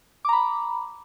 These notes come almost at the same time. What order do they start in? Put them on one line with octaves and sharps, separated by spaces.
D6 A#5 B5